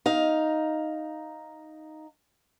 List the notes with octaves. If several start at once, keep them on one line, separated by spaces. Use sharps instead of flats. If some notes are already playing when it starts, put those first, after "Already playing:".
D#4 F5